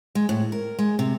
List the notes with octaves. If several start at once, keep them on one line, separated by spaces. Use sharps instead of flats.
G#3
A2
A#4
G#3
C3